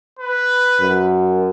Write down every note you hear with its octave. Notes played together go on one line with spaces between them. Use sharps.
B4
F#2